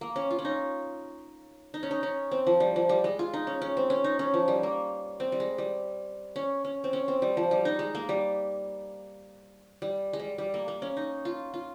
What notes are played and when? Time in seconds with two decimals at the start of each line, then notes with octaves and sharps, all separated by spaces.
0.01 A#3
0.16 C#4
0.31 F4
0.39 C#4
0.45 D#4
1.74 D#4
1.83 C#4
1.91 D#4
2.03 C#4
2.31 C4
2.47 F3
2.60 G3
2.76 F3
2.89 G3
3.04 G#3
3.19 F4
3.34 D#4
3.47 C#4
3.62 C#4
3.77 C4
3.90 C#4
4.04 D#4
4.19 C#4
4.34 F3
4.48 G3
4.63 A#3
5.20 C4
5.32 G3
5.40 G#3
5.58 G3
6.36 C#4
6.65 C#4
6.84 C4
6.93 C#4
7.08 C4
7.22 G3
7.37 F3
7.51 G3
7.65 D#4
7.79 G#3
7.95 A#3
8.09 G3
9.82 G3
10.13 G#3
10.19 G3
10.38 G3
10.54 A#3
10.68 A#3
10.82 C#4
10.97 D#4
11.25 F4
11.54 F4